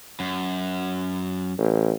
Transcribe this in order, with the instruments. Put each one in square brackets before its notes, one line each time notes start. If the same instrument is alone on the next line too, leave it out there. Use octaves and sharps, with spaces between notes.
[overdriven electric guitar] F#2
[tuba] A1